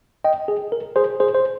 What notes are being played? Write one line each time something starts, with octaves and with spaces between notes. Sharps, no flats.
D#5 G5
G#4
A#4
G#4 C5
G#4 C5
C5